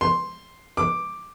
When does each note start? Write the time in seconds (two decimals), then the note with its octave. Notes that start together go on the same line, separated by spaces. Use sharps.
0.01 C6
0.77 D6